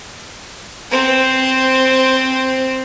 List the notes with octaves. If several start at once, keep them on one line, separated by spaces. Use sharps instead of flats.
C4 C5